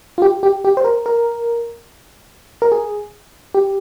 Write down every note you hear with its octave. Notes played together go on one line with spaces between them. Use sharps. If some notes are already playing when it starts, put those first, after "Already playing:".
F4
G4
G4
G4
C5
A#4
A#4
A#4
G#4
G4